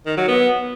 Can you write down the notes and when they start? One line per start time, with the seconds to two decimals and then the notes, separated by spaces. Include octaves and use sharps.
0.06 D#3
0.17 F#3
0.28 B3